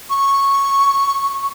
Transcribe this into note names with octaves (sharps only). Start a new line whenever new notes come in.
C#6